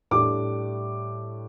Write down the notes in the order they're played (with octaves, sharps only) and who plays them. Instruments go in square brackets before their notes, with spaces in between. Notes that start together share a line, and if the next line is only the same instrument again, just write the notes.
[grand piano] A2 G3 D4 D6